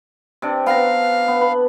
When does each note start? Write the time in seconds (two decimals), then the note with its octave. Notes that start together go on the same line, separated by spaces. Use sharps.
0.42 C3 D4
0.66 B3 F5 A#5
1.28 B3
1.41 B4